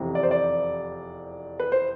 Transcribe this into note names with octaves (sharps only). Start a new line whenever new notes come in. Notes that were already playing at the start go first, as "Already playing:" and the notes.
Already playing: F1 E2 C3
D5
C5
D5
B4
C5